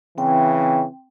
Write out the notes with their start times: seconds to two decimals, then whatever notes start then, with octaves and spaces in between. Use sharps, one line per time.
0.18 C#3 E3 C4 G5